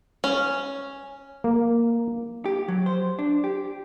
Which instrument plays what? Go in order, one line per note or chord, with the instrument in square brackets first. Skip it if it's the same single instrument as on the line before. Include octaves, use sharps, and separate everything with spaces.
[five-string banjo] C#4
[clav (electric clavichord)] A#3
[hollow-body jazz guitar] G4
F#3
C5
D4
G4